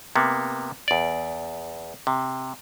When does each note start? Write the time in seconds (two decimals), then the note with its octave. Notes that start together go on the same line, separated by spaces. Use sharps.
0.15 C3 A#3 B3
0.88 E2 D5
2.07 C3